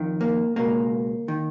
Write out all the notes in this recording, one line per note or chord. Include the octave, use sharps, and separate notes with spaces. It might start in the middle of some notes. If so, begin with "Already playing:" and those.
Already playing: F2 D#3
A#3
C#2 B2 A#3
D#3